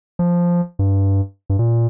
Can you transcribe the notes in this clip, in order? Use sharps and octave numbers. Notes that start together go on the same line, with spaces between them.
F3
G2
G2
A#2